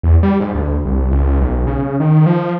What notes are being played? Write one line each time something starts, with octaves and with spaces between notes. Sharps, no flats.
E2
G3
G#2
D2
C2
C#2
B1
C#3
D#3
F3